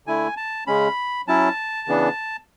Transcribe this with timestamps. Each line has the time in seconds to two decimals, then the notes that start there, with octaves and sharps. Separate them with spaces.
0.06 D3 A3 E4 G#5
0.37 A5
0.67 C#3 G#3 C#4 B5
1.28 F#3 C#4 E4 A5
1.88 C#3 E3 B3 D4